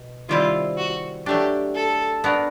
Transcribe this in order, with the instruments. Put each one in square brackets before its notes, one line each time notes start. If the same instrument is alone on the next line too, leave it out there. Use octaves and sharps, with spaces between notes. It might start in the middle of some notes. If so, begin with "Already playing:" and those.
Already playing: [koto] B2
[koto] C3 D#3 G3 C4 E4 [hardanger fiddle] F4
[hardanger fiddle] F#4
[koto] F#3 A3 D4 [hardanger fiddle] G4
[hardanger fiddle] A4
[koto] B3 D4 F#4 A#4